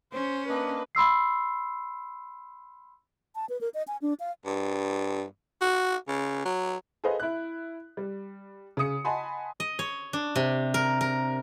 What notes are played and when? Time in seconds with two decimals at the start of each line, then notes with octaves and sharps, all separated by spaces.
0.13 C#4 C5
0.49 A#3 D4 B4 D#5
0.95 B5 C6 E6 C7
3.35 A5
3.49 B4
3.61 A#4
3.74 D#5
3.88 G#5
4.02 D4
4.20 F5
4.45 G2
5.61 F#4
6.08 C#3
6.45 F#3
7.04 G#4 A4 B4 C5 D#5 F5
7.20 E4 F#6
7.97 G3
8.77 C#3 G#4 D#6 C#7
9.05 D#5 F#5 G#5 A5 B5 C6
9.60 D#5
9.79 C#5
10.13 D4
10.36 C3
10.74 A#4
11.01 A#4